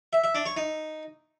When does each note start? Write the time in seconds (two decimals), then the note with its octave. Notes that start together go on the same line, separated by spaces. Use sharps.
0.13 E5
0.24 E5
0.35 D4
0.46 C#5
0.56 D#4